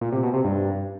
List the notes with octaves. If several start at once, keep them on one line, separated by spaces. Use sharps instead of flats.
A#2
C3
B2
C3
G2